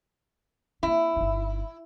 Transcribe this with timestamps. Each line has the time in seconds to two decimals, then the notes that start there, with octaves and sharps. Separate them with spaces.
0.83 A#3 C4 E4
1.16 G1 D#4